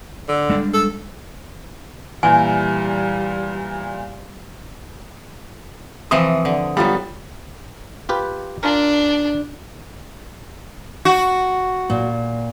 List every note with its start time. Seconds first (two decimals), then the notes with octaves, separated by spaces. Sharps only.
0.28 D3
0.50 G3 G#3 D4
0.74 A4
2.23 A#2 E3 G3 G#5
6.11 C3 E3 F3 D#6
6.45 D3
6.77 F#3 G3 B3 F4
8.09 F4 G4 B4
8.63 D4 F4 A#4
11.05 F#4
11.90 A#2